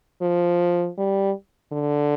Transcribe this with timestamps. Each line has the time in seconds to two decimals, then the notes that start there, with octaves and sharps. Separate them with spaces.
0.22 F3
0.98 G3
1.72 D3